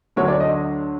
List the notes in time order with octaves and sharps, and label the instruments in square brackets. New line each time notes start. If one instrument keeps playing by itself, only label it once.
[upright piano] D2 D3 F#3 A3 C#5
D5
D#5